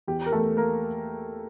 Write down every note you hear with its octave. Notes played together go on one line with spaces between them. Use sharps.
E2 G4
A#4
E2 A3 A4
A#3 A#4